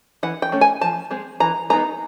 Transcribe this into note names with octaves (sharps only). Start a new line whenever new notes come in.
E3 F#5
G5
A3 C#4
G#5
F3 A5
G#3 C4
E3 A#5
G#3 B3 D#4 A#5